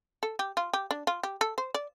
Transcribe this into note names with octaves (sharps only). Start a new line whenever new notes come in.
A4
G4
F4
G4
D4
F4
G4
A4
C5
D5